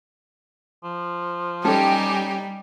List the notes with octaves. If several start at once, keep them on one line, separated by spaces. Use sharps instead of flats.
F3
G3 C#4 D#4 G4 A4 G#5